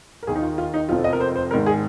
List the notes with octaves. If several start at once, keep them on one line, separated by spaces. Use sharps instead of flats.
A#4
D#2 D#3 G#4
D#4
F4
F4
D#4
F1 F2 C3 F3 F4
D#5
A#4
C5
C5
G#1 G#2 D#3 A#4
G#4